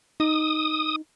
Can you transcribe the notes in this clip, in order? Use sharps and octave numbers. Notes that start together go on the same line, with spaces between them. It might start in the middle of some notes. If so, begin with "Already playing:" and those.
D#4 D#6